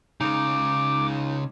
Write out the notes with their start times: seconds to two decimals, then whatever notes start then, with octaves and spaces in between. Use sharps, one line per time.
0.21 C#3 G#3 D#4 D6